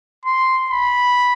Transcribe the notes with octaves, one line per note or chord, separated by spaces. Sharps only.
C6
B5